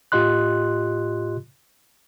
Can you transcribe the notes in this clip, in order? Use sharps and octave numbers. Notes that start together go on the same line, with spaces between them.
A2 F4 G4 D#5 C6 F#6